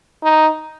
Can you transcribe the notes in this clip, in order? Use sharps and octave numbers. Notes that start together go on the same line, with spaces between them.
D#4